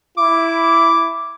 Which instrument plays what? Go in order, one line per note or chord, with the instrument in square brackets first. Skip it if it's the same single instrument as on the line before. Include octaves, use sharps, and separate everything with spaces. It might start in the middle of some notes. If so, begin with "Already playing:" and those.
[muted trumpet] E4 [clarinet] D6